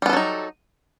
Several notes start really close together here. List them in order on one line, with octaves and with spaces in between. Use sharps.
G3 B3 A4 F#3 D#4